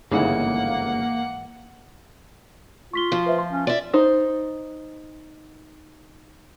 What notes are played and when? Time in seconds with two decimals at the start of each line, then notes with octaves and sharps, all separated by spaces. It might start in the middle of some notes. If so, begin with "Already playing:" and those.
0.11 G1 G#2 C#3 E3 G#3 A#3 F#5
2.93 F4 C#6 B6 G7
3.12 F3
3.26 B4 C5 E5
3.38 C6
3.52 C#4
3.67 F4 D5 E5
3.94 D#4 C5